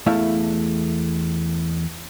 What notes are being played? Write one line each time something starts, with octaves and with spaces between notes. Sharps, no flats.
E2 A3 E4 E5 F5